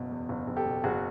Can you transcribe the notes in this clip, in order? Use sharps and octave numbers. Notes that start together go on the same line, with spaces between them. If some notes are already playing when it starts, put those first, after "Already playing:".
Already playing: F#1 B2
E2
F#1
F#1
G4 A4
B2
F#1 F#4 G#4